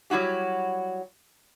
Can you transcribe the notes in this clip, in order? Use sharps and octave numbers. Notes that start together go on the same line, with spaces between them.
F#3 G3 E4 F#4 G4